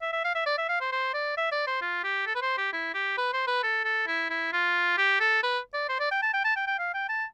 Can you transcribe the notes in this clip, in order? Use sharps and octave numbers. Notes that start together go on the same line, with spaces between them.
E5
E5
F5
E5
D5
E5
F5
C5
C5
D5
E5
D5
C5
F4
G4
A4
B4
C5
G4
E4
G4
B4
C5
B4
A4
A4
E4
E4
F4
G4
A4
B4
D5
C5
D5
G5
A5
G5
A5
G5
G5
F5
G5
A5